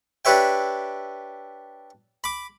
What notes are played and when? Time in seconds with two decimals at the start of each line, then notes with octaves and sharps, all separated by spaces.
0.25 D4 G4 B4 C#5 E5 G5
2.24 B5 D6